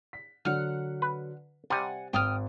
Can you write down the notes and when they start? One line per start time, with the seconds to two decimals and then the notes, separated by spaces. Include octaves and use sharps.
0.13 B6
0.45 D3 F#3 F#5 F6
1.02 B4
1.70 C3 G3 F#5 G#5 A6
2.13 G#1 G5 D#6 F6